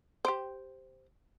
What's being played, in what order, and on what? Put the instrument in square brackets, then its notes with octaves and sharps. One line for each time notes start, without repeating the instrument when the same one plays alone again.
[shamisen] G4 C5